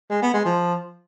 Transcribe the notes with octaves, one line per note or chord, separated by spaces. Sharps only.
G#3
B3
G#3
F3